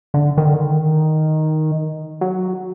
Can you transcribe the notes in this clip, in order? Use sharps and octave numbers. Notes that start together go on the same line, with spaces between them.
D3
D#3
D3
D#3
F#3